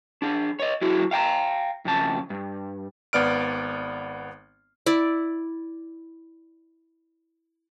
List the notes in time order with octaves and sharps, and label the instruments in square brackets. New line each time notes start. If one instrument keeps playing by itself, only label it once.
[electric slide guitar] D4 G#4
C#5 D#5
F#3 E4 F#4 G#4
F5 G5 A5 A#5
F2 C#3 A5
G2
[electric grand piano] G#1 B3 D5 F6 D7
[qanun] E4 D5